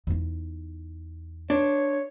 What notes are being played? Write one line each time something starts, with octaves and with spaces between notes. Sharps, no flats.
E2 D#4
D4 C#5